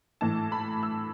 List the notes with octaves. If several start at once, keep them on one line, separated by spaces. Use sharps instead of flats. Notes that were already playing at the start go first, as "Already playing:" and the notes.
A2 E3 A5
B5
E6